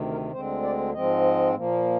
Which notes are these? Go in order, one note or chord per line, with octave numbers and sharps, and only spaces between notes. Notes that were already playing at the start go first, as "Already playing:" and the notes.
Already playing: D2 C3 D#3
A#4
D2 D3 G#3 C4 C5
D5
G#2 F3 G#3 C4 D#5
A#2 F3 A#3